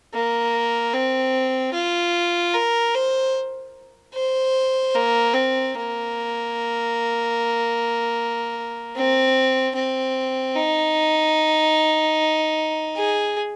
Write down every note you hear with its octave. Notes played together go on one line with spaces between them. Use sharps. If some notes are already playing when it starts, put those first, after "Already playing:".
A#3
C4
F4
A#4
C5
C5
A#3
C4
A#3
C4
C4
D#4
G#4